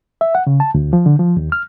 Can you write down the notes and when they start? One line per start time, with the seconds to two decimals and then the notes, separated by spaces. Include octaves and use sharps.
0.21 E5
0.35 F#5
0.47 C#3
0.60 A5
0.75 D2
0.93 F3
1.06 D3
1.19 F3
1.37 D#2
1.52 F6